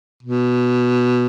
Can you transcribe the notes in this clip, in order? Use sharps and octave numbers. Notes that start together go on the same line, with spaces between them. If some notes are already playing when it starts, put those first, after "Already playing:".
B2